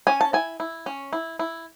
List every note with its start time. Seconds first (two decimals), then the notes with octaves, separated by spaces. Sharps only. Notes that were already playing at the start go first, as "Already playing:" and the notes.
0.07 C#4 G#5
0.21 A5
0.33 E4 G#5
0.60 E4
0.86 C#4
1.13 E4
1.39 E4